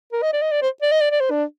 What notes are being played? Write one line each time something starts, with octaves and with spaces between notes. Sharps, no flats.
A#4
D#5
D5
D#5
D5
C5
D5
D#5
D5
D5
C5
D4